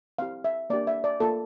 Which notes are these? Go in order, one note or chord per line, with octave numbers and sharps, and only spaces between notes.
C4 E4 G4 F5
E5
A#3 D4 G4 D5
E5
D5
A#3 F4 A4